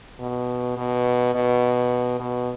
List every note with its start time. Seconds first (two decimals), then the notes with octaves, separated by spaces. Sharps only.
0.20 B2
0.77 B2
1.35 B2
2.20 B2